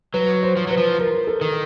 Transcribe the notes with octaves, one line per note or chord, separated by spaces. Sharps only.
F#3 B4
C5
F3
F#3 B4
F3
A#4
A4
D#3